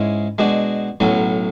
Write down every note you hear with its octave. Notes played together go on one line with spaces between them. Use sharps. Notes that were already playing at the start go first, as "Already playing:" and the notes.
Already playing: G#2 G#3 C#4 E4
B2 G#3 D4 F#4
B1 A2 F#3 C#4